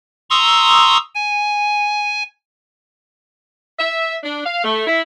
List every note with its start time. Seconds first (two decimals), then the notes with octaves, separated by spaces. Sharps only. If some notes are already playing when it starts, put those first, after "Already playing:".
0.30 A#5 C6 C#6 D#6 E6
1.15 G#5
3.78 E5
4.24 D4
4.45 F5
4.64 A3
4.87 E4